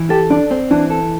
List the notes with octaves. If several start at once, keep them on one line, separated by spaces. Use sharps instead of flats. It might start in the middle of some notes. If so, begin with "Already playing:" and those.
Already playing: E3
G4 A4
D4 D5
C4
E3 D4
A4